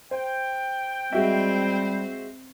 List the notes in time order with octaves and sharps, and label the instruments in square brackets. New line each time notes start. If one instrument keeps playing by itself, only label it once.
[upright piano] C5 [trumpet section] G5
[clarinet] G3 [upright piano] G#3 F#4 E5 [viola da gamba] C4 C5